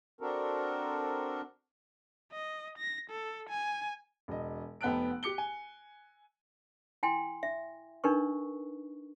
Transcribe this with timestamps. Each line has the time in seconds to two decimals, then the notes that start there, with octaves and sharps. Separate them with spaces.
0.21 C4 D4 F#4 A4 A#4
2.32 D#5
2.78 A#6
3.10 A4
3.49 G#5
4.28 E1 D#5
4.81 F1 B3 G5 A5 F#6 D7
5.23 G4 D6 C#7 G7
5.38 G#5
7.03 E4 G5 G#5 C6
7.43 E5
8.04 D4 D#4 A#4 B4 C#6